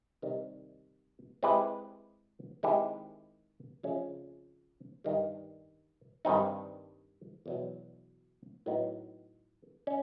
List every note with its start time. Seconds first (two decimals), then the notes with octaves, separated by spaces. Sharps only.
0.22 C3 D#3 G3
1.43 G#3 C4 E4 G4 B4
2.63 D#3 G#3 C4 E4 G4
3.83 F2 C#3 F3 A3 C#4
5.04 G2 D#3 G3
6.25 G2 D#3 G3 C4 D#4
7.46 E2 B2 F#3
8.66 A2 F#3 B3 D#4
9.87 C#4